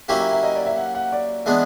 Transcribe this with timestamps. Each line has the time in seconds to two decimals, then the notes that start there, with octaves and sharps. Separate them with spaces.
0.08 F#3 A#3 C#4 E4 G4 E5
0.20 E5
0.32 E5
0.43 D#5
0.55 D5
0.66 E5
0.77 F#5
0.95 F#5
1.12 D5
1.46 E3 G#3 B3 D4